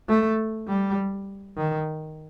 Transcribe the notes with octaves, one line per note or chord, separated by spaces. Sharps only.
A3
G3
D#3